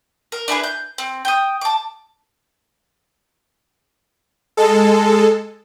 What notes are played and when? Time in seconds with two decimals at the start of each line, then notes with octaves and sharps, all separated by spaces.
0.32 A#4
0.48 D4 E4 G#4 B4
0.63 G6
0.98 C4
1.25 G5 D#6
1.61 A5 D6
4.57 G#3 A4